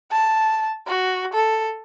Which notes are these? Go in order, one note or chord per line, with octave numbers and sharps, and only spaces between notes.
A5
F#4
A4